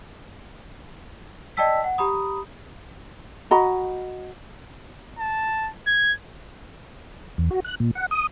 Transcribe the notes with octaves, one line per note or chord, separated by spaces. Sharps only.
D5 D#5 G5 A5 E6 B6
F#5
G4 A#5 B5 D#6
F#4 D#5 A#5 B5
A5
G#6
E2
F#4
F#6
A#2
F#5
D#6